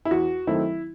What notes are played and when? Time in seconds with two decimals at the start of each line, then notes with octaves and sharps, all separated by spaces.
0.05 E4
0.11 E2 F#4
0.47 D#3 F#3 A3 C4 E4